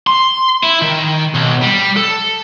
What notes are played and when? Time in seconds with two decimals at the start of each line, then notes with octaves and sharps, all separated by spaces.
0.07 C6
0.63 E4
0.82 D#3
1.35 B1
1.63 G3
1.97 A4